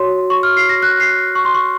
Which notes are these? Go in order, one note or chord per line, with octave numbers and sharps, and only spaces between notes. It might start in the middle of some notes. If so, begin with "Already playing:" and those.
Already playing: F#4 C#5 C6
C#6
F6
C7
A#6
F#6
C7
C#6
C6
C#6